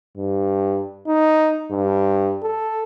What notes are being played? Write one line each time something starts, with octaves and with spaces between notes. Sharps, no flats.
G2
D#4
G2
A4